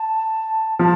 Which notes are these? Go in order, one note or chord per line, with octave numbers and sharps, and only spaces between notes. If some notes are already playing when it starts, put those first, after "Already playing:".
Already playing: A5
F3 A5